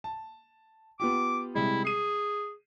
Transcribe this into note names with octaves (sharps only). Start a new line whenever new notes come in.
A5
B3 F4 G4 D6
C3 G3 G#3 E4
G#4 C7 D#7